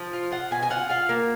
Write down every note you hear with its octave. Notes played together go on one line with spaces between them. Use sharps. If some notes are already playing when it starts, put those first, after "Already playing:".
Already playing: F3
F4
F4 F#5
B2 G#5
G#5
F4 F#5
F4 F5
A#3